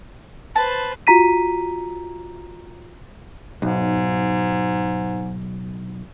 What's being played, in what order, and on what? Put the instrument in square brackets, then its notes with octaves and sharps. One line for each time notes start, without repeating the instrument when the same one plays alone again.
[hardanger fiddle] B4 C5 [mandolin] A5
[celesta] F4 F#4 A#5 B6 D#7
[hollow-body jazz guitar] B1 [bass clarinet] G#2